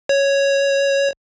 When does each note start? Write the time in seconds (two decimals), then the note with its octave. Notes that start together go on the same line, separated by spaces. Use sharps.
0.09 C#5